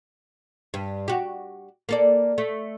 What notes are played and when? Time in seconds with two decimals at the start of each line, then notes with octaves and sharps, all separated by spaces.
0.74 G2
1.08 F#4 G4
1.89 A#3 A4 D5
2.38 A3